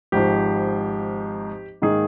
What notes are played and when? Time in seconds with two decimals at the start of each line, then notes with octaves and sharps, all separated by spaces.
0.12 G#1 G#2 F3 G4
1.82 G#2 D#3 A#3 G#4